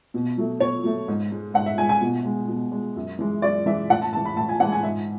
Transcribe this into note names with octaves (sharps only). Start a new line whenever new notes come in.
B2
F#3 A3
B2 C#5
F#3 A3
G#2
G#3
G#2 F#5
E5
G#3 G#5
G#5
B2
G#3
B2
G#3
F#2
E3 G#3
F#2 D5
E3 G#3 E5
A2 F#5
A5
E3 G#3 A5
B5
A2 A5
G#5
E3 G#3 F#5
G#5
G#2 E5